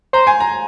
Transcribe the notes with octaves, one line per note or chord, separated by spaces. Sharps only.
C5 A#5
G#5
A#5